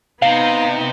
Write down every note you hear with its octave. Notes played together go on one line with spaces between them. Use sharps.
C3 B3 D#4 F5